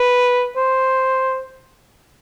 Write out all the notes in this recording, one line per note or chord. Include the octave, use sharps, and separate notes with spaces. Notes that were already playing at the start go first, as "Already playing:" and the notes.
Already playing: B4
C5